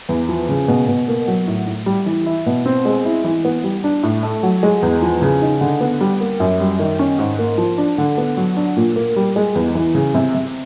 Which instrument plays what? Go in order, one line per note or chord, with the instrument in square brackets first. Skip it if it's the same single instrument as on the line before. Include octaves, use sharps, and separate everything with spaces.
[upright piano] E2
F3
C#3
B2
B2
A#3
F#3
A2
A2
G3
E3
E4
B2
C4
G#3
E4
E3
B3
G3
D4
A2
A3
F#3
G#3
E2
F3
C#3
D#4
D3
B3
G3
A#3
F#2
G3
D#3
C#4
G#2
A#3
F3
D4
D3
B3
F#3
D4
A#2
A#3
G3
G#3
E2
E3
C#3
C3
C3